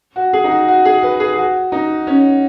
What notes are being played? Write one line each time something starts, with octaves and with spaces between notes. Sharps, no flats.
F#4
G#4
D#4
F#4
F#4
G#4
B4
G#4
G#4
F#4
D#4
C#4